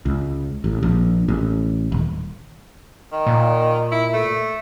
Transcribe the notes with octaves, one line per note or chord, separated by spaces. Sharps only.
C#2
A1
A#1
A1
D#1
D#3
A#2
E4
A3